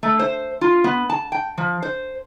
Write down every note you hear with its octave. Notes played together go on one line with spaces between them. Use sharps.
A3
C5
F4
B3
A5
G5
F3
C5